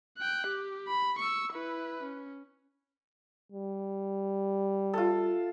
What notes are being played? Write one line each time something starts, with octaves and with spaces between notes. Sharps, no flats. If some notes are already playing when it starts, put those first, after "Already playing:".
G5 F#6
G4
B5
C#6 E6
E4 B4
C#4
G3
F4 A4